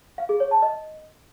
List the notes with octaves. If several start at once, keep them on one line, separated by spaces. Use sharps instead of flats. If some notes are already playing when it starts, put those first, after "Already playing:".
F5
G#4
C#5
A5
D#5